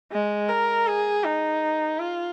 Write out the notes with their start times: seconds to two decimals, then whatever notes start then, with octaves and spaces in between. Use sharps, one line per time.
0.12 G#3
0.49 A#4
0.87 G#4
1.24 D#4
1.99 F4